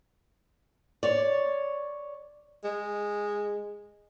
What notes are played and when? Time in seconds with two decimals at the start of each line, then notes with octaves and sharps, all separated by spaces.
1.03 C#5 D5
2.64 G#3